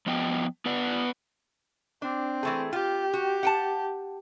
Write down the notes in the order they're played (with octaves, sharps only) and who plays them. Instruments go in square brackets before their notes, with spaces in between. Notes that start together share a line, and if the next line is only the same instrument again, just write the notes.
[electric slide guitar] F3 B3 D#5 G5
B3 B4 D5 F#5
[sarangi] C4 [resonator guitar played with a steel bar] D4
[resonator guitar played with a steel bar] E3 A3 G#4
[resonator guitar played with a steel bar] F4 [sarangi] G4
[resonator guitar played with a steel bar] F#4
F#5 G5 A5